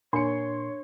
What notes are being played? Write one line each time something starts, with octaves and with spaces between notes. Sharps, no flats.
A#2 D4 C#5 C6 C#7